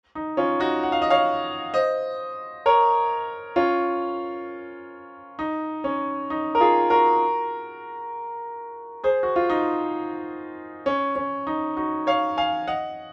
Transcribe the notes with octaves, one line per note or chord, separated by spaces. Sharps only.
D#4
C#4 F4
D#4 F#4
F#5
F5
D#5
C#5 F5
C5 D#5
A#4 C#5
C#4 F4
D#4
C#4
D#4
A#4
F4 G#4
F#4 A#4
G#4 C5
F#4
F4
D#4
C#4
C#4
D#4
D#4 F#4
C#5 F5
F5 G#5
D#5 F#5